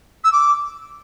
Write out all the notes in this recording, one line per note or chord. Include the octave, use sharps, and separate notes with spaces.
E6
D6